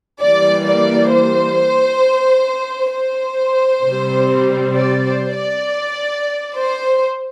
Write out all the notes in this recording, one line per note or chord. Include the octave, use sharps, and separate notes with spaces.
E3 G3 A#3 D5
D5
C5
C5
C3 G3 C4
D5
C5
D5
C5